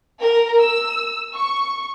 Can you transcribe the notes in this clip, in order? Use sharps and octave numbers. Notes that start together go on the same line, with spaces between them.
A#4
E6
C#6